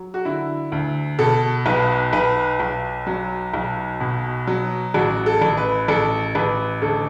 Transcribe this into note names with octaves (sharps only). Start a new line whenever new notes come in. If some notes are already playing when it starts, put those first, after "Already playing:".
Already playing: F#3
F#4
D3 E4
D2
B2 A4
B1 B4
B1 B4
B1
F#3
B1
B2
F#3
A1 F#4
A4
A1
B4
A1 A4
A1 B4
D2 A4